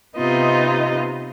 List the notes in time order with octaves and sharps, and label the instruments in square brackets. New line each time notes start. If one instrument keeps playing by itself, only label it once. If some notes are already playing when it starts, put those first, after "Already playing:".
[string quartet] C3 B3 D#4 F4 D#5